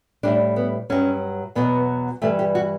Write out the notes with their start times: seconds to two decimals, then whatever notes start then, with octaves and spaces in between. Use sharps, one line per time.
0.23 A2 G3 D4
0.56 B3
0.90 G2 F#3 C#4
1.55 E2 B2 F#3 B3
2.22 G2 E3 G3 A3
2.39 G4
2.55 F#4